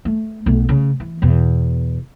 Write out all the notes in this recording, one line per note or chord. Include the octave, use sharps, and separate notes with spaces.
A3
B1 A3
C#3
E3
E2 B2